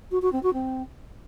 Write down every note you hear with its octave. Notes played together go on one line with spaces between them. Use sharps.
F#4
F#4
C4
F#4
C4